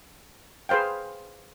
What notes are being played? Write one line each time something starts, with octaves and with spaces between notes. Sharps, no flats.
G#4 B4 C5 F5 G5